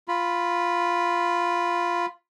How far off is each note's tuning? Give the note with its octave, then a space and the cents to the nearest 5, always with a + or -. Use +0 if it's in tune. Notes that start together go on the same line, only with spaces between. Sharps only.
F4 +0 B5 +0